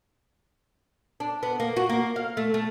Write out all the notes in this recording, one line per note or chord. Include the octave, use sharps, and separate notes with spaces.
D4
B3
A#3
F#4
A#3
F5
A3
A3